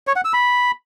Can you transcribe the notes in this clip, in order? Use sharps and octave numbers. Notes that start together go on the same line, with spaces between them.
C#5
F#5
E6
B5